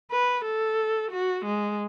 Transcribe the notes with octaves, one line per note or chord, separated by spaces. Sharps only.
B4
A4
F#4
G#3